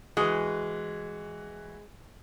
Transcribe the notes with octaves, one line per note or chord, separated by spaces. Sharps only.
E3 G#3 F#4